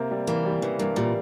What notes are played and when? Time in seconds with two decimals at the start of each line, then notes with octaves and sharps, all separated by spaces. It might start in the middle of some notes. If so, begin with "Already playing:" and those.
Already playing: C3 A#3
0.11 G3
0.27 E3 A#3
0.45 G3
0.62 C#3 E3
0.79 G2 A#3
0.96 A#2 G3